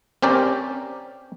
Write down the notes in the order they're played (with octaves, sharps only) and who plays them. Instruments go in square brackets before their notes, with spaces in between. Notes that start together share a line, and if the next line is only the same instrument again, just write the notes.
[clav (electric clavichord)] C4 C#4 G4 A#4 D5